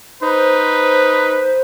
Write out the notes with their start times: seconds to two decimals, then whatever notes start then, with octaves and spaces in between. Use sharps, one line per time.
0.23 D#4 B4 C5